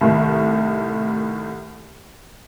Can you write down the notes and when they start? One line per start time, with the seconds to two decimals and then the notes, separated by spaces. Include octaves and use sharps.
0.01 C2 A2 D#3 A3